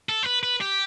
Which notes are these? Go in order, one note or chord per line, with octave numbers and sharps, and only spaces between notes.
A4
C5
B4
B4
G4